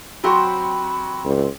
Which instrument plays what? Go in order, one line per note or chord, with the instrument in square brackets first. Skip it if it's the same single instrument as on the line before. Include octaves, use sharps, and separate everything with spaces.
[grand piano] F#3 F#4 C#6 [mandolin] C4 G4 C5 [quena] B5
[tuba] C#2